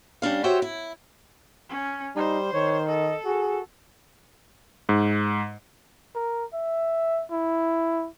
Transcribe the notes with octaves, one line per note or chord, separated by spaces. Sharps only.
G3 C#4 D4 F5
F#4 G4 C5 C#5 E5
E4
C#4
G3 D#4 C5
D#3 C#5
A4 D#5
F#4 G#4
G#2
A#4
E5
E4